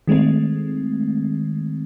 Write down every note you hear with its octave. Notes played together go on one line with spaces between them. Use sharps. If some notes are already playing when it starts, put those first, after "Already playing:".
D#3 G#3 A3 C4